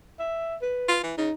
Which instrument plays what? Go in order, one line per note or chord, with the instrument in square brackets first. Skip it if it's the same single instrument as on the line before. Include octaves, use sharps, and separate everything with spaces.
[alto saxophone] E5
B4
[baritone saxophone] F4
E3
[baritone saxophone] C#3 [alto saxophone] D#4